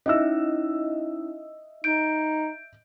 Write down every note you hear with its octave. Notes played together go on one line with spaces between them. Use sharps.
C#4 D#4 E4 D#5 E5 E6
D#4 G6 D7